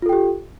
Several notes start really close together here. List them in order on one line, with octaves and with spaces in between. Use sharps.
F4 A4 G5 G4